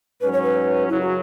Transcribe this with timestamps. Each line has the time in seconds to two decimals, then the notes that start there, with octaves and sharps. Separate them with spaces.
0.21 G#2 F#3 C#4 B4
0.32 C#5
0.44 B4
0.89 F#2 C#3 F#3 E4
1.01 F#4